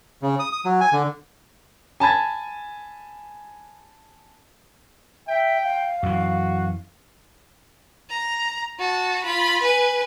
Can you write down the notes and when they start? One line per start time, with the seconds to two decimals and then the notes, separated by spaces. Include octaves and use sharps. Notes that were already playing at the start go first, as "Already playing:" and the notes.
0.22 C#3
0.39 D#6
0.53 D#6
0.65 F#3
0.81 G#5
0.93 D3
2.00 G#5 A5 B5 G#6 A6
5.28 E5 G5
5.64 F5
6.03 F#2 E3 F#4
8.10 A#5
8.79 F#4 A5
9.23 F4 B5
9.62 B4 G#5